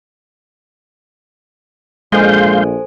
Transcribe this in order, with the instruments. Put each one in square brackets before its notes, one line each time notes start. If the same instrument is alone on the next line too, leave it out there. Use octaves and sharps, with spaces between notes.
[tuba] A#1 [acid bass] G#3 [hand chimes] A4 C5 G#5 [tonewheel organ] F5 C6 G6